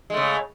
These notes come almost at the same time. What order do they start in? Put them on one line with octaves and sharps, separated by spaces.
G#3 A3 C#3